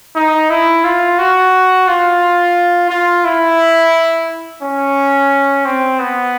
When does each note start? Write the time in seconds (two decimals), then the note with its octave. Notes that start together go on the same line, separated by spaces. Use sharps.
0.15 D#4
0.50 E4
0.84 F4
1.19 F#4
1.88 F4
2.90 F4
3.25 E4
4.62 C#4
5.65 C4
5.99 B3